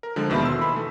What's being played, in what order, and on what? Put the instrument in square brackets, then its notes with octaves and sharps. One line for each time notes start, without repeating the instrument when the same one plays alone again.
[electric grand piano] A#4
D3 F3 G#3
D#2 B2 D#3 E5 B5
C6 E6
E3 B5
A3